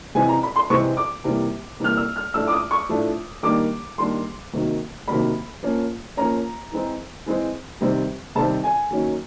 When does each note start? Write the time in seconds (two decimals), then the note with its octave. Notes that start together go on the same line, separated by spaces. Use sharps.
0.15 C3 E3 G#3 C4 G#5
0.29 A#5
0.43 B5
0.56 C6
0.70 C3 E3 G#3 C4 C#6
0.97 D6
1.24 C3 E3 G3 A#3
1.80 C3 E3 G3 A#3 F6
1.97 E6
2.16 F6
2.34 A2 F3 A3 D4 E6
2.48 D6
2.52 D#6
2.71 C#6
2.89 A2 F3 A3 D4
3.43 D#3 G3 A#3 D4 D6
3.98 D#3 G3 A#3 D4 C6
4.53 C3 D#3 F#3 A#3
5.08 C3 D#3 F#3 A#3 B5
5.63 F3 A#3 C#4
6.17 F3 A#3 C#4 A#5
6.72 E3 G#3 C4
7.26 E3 G#3 C4
7.81 C3 D#3 G3 C4
8.35 C3 D#3 G3 C4 A5
8.64 G#5
8.91 D#3 F#3 A#3 C#4